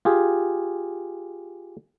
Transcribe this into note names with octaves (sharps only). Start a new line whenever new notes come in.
F4 G4 G#4